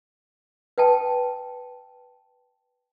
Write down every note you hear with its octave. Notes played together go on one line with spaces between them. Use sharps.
B4 G5 A5